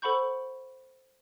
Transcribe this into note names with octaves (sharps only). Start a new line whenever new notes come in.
A4 C5 F#5 B5 C#6 G6